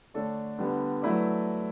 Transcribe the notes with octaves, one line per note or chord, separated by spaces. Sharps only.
D3 A3 D4 A4 C#5
D3 G3 B3
F#3 A3 E4 B4 D5